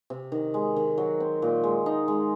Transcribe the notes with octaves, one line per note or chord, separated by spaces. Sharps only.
C3
D#3
G#3
D#3
F#3
C4
A#2
G#3
D#4
G#3